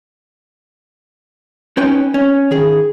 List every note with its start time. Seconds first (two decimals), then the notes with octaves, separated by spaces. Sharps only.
1.77 C#4 D#4 B4 C#5 G5
2.14 C#4
2.51 D#3 G#4